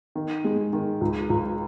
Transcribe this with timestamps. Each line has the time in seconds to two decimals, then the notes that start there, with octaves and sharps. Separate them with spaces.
0.15 D#3
0.44 G#3
0.73 D#3
1.01 C#2
1.30 C#2